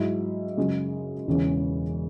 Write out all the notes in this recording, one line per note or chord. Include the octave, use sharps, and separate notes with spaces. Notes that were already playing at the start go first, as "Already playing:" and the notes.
Already playing: G#2 F#3 E4
F#2 C#3 G#3
E1 E2 C#3 E3 C#4